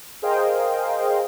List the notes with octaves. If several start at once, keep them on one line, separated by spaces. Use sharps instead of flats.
G#4 A#4 C5 D#5 F5 G5